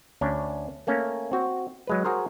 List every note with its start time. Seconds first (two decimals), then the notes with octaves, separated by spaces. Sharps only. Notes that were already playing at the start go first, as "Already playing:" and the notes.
0.21 D2 C#4 D4
0.87 A3 A#3 C#4
1.32 C4 F#4
1.87 F#3 G#3 B4
2.05 F#4 G#4 A#4 C5